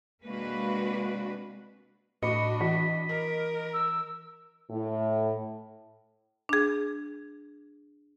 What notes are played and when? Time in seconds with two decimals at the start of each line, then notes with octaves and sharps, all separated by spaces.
0.23 C3 G#3 A#3 D4 F#4 B4
2.23 A2 D4 F#4 D#5 B5 D6 C#7
2.61 E3 B6
3.09 A#4
3.74 E6
4.70 A2
6.49 D4 G#4